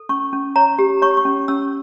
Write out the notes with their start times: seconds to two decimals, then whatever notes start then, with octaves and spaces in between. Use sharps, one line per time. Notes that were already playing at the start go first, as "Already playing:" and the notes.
Already playing: A4
0.09 C#4 C#6
0.33 C#4
0.56 C#5 A#5
0.79 G4
1.02 C#5 C#6
1.17 C#6
1.25 C#4
1.48 C#4 E6